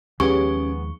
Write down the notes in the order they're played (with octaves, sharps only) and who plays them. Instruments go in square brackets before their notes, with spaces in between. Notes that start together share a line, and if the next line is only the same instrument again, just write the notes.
[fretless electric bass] D#2 F3 G#3 [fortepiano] B3 G#4 [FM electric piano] C#4 G4 [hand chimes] C#6